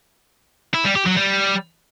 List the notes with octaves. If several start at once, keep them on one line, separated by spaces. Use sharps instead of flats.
E4
G3
G4
F#3
G3